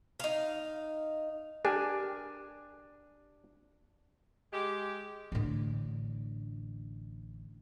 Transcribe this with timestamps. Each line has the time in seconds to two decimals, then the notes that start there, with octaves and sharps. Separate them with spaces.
0.20 D#4 F5
1.65 D4 G4 A#4 G#5
4.52 G#3 G4
5.32 A1 D3